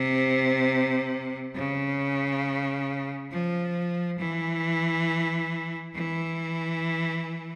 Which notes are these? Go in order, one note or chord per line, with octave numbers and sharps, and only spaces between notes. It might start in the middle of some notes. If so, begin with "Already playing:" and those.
Already playing: C3
C#3
F3
E3
E3